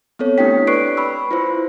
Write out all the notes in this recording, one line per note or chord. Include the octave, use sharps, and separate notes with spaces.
B3 C4 A4 C#5
A3 D4 E4 G4 G5 B6
B4 D5 C#6 F#6 C7 D7
B5 C#6 E6
E4 F4 C5